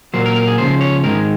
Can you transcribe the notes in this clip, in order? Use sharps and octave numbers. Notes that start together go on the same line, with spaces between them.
A#2 F#3 A#3 C5
A#4
A#4
G#4
C#2 C#3 F3 C5
C#5
G#2 D#3 G#3 A#4